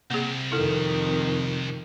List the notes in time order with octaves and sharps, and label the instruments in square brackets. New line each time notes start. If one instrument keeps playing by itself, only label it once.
[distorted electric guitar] C2 [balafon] A#3 G#4
[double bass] F2 D#3 [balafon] E4 A4